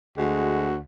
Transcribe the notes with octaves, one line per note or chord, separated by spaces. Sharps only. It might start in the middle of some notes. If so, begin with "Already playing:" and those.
D2 G#3 F#4